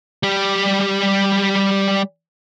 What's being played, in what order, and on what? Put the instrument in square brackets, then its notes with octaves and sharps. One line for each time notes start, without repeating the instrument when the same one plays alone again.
[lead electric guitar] G3 G4